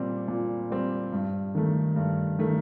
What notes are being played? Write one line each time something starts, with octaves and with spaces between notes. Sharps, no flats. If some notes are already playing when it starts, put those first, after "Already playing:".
Already playing: A#2 G3 C4
A#2
G3 C4
G2
D#3 A3
G2
D#3 A3